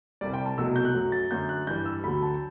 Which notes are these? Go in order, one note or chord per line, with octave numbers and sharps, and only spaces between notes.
C2 C3 G3 D5
G5
A5
C2 B2 F#3 A3 E6
G6
F#6
F#2 F#3 A3
A6
F#2 D3 A3 G6
F#6
G2 E3 G3 G6
E6
D2 D3 F#3 A3 B5
A5